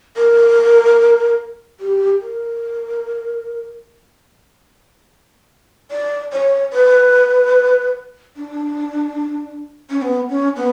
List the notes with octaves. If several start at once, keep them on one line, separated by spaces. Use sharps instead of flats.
A#4
G4
A#4
D5
C#5
B4
D4
C#4
B3
C#4
B3